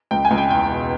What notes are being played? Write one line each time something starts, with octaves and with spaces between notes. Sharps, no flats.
C#2 G5
G#5
C#2
G5
E2 G5
B2